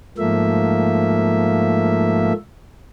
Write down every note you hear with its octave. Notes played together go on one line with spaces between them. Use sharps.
G#2 F3 A3 A#3 E5